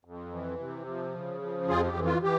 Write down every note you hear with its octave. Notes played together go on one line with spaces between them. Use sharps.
F2
E3
C3
F3
C#3
F3
F2 F4 G#4
G4
E3
F4
E3 G4